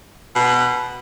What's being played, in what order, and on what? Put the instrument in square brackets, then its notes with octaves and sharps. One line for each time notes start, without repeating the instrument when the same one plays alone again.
[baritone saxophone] B2